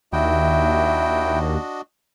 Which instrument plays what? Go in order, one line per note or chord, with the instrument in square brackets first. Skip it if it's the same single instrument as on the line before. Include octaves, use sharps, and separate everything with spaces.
[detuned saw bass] D#2 [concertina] D4 F#4 D#5 [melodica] E4 G5 [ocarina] E5